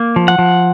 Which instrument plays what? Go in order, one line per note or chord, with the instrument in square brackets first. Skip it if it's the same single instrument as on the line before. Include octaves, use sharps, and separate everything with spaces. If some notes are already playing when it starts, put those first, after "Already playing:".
Already playing: [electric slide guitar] A#3
F3
[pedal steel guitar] F#5
[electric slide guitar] F3